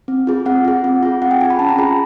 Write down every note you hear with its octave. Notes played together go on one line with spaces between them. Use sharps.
C4
F4 G#4
C4 F#5
F4 G#4
C4
F4 G#4
C4 F#5
G5
F4 G#4 G#5
B5
C#4 A5
A#5
F4 G#4 B5